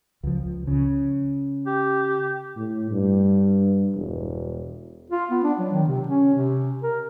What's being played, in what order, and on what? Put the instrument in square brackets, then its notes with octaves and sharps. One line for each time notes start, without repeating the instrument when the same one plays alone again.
[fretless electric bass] C#2 F3
C#3
[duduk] G4
[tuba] A2
G2
E1
[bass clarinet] F4
B3
D4
F#3
D#3
C3
C#4
C3
A#4